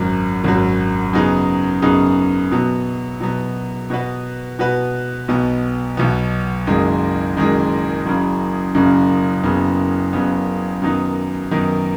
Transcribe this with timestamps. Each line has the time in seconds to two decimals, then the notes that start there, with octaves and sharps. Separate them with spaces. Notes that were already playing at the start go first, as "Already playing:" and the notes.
Already playing: G#1 F#2 F#3
0.44 G#1 F#2 F#3
1.13 F#2 C#3 B3 D#4 G#4
1.82 F#2 C#3 B3 D#4 G#4
2.51 B2 F#3 B3
3.20 B2 F#3 B3
3.90 B2 B3 F#4 B4
4.59 B2 B3 F#4 B4
5.28 B1 B2 B3
5.97 B1 B2 B3
6.67 F#1 F#2 D#3 G#3
7.36 F#1 F#2 D#3 G#3
8.05 F#1 F#2 C#3
8.75 F#1 F#2 C#3
9.43 F#1 F#2 C#3 B3
10.13 F#1 F#2 C#3 B3
10.82 F#2 D#3 B3 D#4
11.51 F#2 D#3 B3 D#4